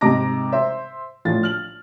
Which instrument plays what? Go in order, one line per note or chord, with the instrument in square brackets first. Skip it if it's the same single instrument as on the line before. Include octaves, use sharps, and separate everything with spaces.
[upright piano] G#2 C3 D#5 A#5 D6 A#6
C5 E5
A#1 A2 F4 A6
F6 F#7